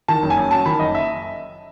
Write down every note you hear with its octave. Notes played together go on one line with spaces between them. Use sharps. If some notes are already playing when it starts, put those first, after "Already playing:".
D#3 A5
F#1
G#5
F#2
F#3 A5
D#3 B5
F#1 D#5
E5